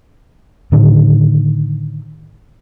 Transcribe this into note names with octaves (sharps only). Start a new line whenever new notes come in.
A2 D3 D#3